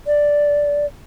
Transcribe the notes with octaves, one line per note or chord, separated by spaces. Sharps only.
D5